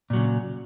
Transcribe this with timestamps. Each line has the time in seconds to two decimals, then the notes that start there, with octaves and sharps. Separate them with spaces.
0.10 A#2
0.13 F#3
0.17 C#3